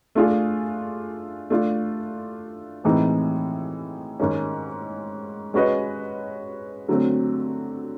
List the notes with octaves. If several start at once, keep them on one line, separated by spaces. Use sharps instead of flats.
A3 D4 F4 G#4
A3 D4 F4
A2 E3 G#3 C4 D#4
G#2 D#3 G#3 C#4
G#3 C#4 F#4 B4 D#5
D3 F#3 A3 C4